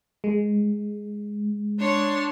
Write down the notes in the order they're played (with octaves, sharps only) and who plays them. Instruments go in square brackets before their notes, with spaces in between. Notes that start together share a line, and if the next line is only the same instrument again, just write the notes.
[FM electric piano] G#3
[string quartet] D4 C#5 C6